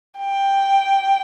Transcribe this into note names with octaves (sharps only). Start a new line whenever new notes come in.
G5